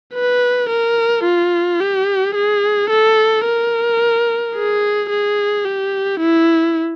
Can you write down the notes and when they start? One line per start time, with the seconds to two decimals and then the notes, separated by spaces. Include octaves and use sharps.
0.14 B4
0.69 A#4
1.24 F4
1.80 G4
2.35 G#4
2.90 A4
3.45 A#4
4.55 G#4
5.10 G#4
5.65 G4
6.20 E4